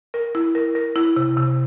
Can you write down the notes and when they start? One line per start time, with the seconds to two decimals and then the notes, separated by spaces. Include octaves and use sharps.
0.14 A#4
0.35 E4
0.55 A#4
0.75 A#4
0.96 E4
1.16 C3
1.37 C3